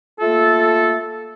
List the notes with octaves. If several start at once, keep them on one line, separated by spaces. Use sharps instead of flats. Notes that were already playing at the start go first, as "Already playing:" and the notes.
A3 A#3 F4 A4